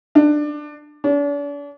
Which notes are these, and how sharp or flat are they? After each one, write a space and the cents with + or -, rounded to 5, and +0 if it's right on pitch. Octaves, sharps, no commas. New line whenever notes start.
D4 +20
D4 -40